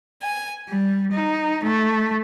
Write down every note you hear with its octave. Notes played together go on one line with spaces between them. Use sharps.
G#5
G3
D#4
A3